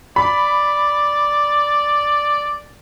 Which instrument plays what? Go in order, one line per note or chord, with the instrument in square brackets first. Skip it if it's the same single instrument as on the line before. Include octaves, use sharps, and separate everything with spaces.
[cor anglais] D5 [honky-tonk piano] B5